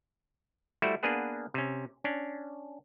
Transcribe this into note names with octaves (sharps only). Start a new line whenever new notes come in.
G3 A3 E4 F#4 C5
A#3 B3 D4 G#4 B4 F#5
C3 C#4
C#4 D4